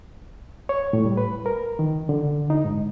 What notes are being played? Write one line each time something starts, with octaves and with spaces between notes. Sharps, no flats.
C#5
A2
G3
B4
A#4
D#3
D3
D#4
G#2